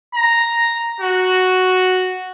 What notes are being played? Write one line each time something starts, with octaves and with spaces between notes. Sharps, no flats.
A#5
F#4